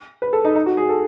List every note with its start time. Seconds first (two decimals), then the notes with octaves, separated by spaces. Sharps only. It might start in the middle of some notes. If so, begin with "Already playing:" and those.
0.22 B4
0.33 A4
0.45 D#4
0.55 D#4
0.66 F#4
0.77 G#4
0.89 A4